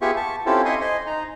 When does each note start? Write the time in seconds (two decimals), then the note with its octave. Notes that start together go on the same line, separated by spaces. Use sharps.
0.02 B3 F4 G4 G#4 E5 C#6
0.16 A5 C#6
0.46 C4 C#4 E4 F4 G4 A4
0.65 D#5 E5 G#5 C6 C#6 D#6
0.81 C5 D#5 G#5
1.07 D#4 A#5